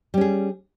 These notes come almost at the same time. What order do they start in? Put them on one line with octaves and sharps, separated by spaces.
G3 C#4 G#4